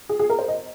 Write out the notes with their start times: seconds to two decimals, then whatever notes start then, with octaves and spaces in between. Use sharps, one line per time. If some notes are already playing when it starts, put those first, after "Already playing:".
0.09 G#4
0.19 G#4
0.30 A#4
0.39 C5
0.48 D#5